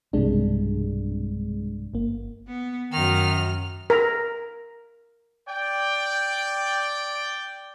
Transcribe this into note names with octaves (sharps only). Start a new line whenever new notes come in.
B1 G2 C3 G#3 D4
G1 A#3
B3
F#2 D#3 F6
A#4
D5 G5